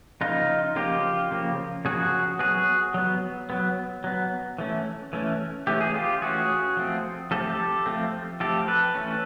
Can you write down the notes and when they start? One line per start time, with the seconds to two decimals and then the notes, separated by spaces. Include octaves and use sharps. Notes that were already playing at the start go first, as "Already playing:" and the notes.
0.21 C#3 F3 A#3 D#4 F4
0.76 C#3 F3 A#3 F4 G4
1.31 C#3 F3 A#3
1.85 C#3 F3 A#3 F#4 G#4
2.39 F#3 B3 F#4 G#4
2.94 F#3 B3
3.50 F#3 B3
4.04 F#3 B3
4.59 E3 A3 C#4
5.13 E3 A3 C#4
5.67 E3 A3 C#4 G4
5.81 G#4
5.94 F4 G4
6.22 E3 A3 C#4 F#4 G#4
6.77 F3 A3 C4
7.31 F3 A3 C4 G4 A4
7.86 F3 A3 C4
8.40 F3 A3 C4 G4 A4
8.68 A4 B4
8.95 E3 A3 C#4